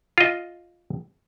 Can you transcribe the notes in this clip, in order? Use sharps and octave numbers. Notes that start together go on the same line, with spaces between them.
F4 D#5